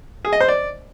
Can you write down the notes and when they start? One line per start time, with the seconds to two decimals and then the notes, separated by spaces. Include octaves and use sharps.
0.25 G#4
0.33 D#5
0.40 C5
0.48 D5